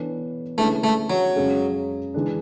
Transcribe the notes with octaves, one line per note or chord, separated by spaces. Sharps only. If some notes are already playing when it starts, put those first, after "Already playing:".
Already playing: E3 B3 D4 A4 C#5
D3 G#3 A3 C#4 E4 B4
A3
F#3
F#2 C#3 G#3 C#4 G#4
E3 G#3 D4